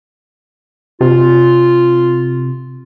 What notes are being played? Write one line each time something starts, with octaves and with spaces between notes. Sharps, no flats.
C3 F4